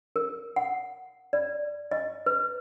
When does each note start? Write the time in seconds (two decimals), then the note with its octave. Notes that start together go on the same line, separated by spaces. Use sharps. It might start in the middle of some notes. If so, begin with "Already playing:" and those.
0.16 A#4
0.56 F#5
1.33 D5
1.91 D#5
2.26 B4